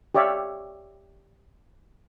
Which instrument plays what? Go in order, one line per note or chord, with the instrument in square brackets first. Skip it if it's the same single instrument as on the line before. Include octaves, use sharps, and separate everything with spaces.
[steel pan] G4 C#5 D5 E5 F5